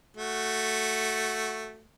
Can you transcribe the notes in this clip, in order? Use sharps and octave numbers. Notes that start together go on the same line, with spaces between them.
A3 F#4